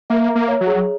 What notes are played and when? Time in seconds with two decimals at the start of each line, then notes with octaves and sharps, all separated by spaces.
0.10 A#3 E5
0.29 A#5
0.35 A#3
0.48 C#5
0.61 F#3
0.67 G#4